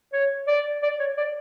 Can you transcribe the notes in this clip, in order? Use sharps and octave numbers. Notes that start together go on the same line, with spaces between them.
C#5
D5
D5
C#5
D5